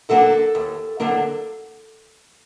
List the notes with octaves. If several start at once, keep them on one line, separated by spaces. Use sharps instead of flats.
D3 F#3 A#3 D4 A4
D#2
D3 F#3 A#3 D4